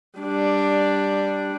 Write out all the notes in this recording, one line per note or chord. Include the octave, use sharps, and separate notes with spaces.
G3 D4